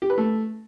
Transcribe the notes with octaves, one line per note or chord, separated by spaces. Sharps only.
G4
B4
A3